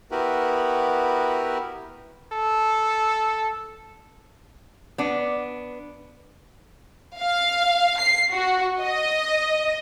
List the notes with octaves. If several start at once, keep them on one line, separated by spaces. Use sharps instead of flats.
B3 E4 F#4 G4 A#4 B4
A4
B3 D4
F5
C7
F#4
D#5